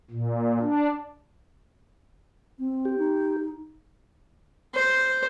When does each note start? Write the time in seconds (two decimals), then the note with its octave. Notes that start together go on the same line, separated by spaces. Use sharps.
0.11 A#2
0.61 D4
2.59 C4
2.85 G4
2.98 D#4
4.74 C5